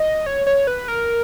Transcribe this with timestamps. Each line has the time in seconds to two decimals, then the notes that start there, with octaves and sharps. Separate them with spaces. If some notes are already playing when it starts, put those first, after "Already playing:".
Already playing: D#5
0.26 C#5
0.47 C#5
0.67 B4
0.88 A#4